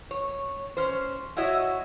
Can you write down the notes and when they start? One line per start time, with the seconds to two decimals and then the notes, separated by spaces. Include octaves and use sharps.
0.11 C#5
0.77 C#4 C5
1.37 E4 F#4 C#5 D#5 E5